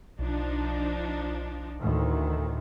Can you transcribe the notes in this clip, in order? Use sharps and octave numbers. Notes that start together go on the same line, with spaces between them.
B1 F3 D4 D#4
D2 A2 D#3